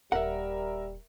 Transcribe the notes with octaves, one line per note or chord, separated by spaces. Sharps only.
D#1 G3 A#4 E5 F#5